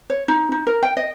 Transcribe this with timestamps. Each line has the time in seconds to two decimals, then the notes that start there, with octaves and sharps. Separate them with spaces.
0.10 C#5
0.28 D#4
0.52 D#4
0.67 A#4
0.83 G5
0.97 D#5